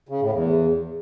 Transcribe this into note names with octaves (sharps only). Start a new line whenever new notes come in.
C#3
A2
E2